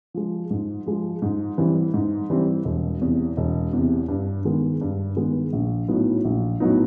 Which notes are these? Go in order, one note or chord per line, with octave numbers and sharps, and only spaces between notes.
F3 G#3
G#2
F3 G#3
G#2
E3 G3 C4
G#2
E3 G3 C4
E1
E2 C3
E1
E2 C3
G2
D#3 G#3 B3
G2
D#3 G#3 B3
A#1
A2 F#3 B3 D#4
A#1
A2 F#3 B3 D#4